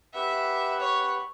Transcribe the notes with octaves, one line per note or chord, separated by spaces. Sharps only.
G4 B4 E5 F#5
C#5